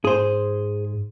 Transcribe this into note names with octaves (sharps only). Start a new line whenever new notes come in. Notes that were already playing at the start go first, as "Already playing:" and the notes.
G#2 G#4 C5